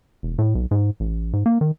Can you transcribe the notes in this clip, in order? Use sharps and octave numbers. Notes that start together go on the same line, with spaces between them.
E1
A2
B1
G#2
A1
G#2
A#3
D#3